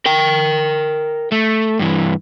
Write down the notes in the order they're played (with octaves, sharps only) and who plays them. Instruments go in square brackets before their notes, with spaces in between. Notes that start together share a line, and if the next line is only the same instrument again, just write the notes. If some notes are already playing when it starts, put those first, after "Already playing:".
[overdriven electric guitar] A#4 G5
A3
G2 E3